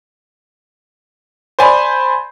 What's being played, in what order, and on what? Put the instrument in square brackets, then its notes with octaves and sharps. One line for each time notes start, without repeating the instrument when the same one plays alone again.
[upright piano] C5 D5 G#5 B5